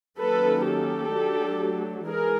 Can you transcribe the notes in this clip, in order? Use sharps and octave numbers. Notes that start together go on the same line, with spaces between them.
D#3 F#3 A#3 C#4 A4 B4
G4 A4
F#3 A3 D4
E3 G#3 G#4 A#4